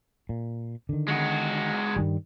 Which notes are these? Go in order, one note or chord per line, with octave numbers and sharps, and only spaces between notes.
A#2
D3 D#3
G#3 F#4
G2 D#3 G3